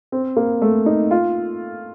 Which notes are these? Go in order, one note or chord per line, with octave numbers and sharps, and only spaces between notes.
C4
A#3
A3
D#4
F4